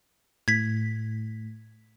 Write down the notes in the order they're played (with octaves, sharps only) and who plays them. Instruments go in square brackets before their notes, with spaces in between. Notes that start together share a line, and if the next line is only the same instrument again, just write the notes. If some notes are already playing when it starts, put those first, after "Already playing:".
[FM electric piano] A2 [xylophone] G#6 B6